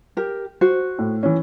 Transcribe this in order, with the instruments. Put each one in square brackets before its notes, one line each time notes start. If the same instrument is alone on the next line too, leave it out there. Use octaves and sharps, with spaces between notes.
[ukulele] G4 A#4
F#4 C5
[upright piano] A2
E3 C#4